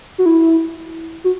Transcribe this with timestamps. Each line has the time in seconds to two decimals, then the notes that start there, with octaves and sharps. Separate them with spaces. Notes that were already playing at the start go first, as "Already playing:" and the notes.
0.18 F#4
0.26 E4
1.24 F#4